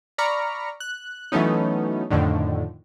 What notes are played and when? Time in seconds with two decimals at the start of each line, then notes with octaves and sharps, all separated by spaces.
0.18 D5 A#5 B5 C#6 F6
0.80 F#6
1.32 E3 F#3 A3 B3 C#4 D#4
2.10 F2 A2 D3 D#3